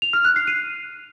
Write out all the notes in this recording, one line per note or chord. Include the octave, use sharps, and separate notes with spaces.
F7
F6
F#6
C7
D#7